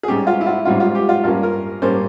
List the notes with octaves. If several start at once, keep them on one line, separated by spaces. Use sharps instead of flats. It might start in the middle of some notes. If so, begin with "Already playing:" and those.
G#4
G#2 G3 C#4 G4
F4
E4
F4
G#2 G3 C#4 F4
F4
G4
F4
G2 G3 A#3 C#4 F4
A#4
G2 G3 A#3 C#4 C5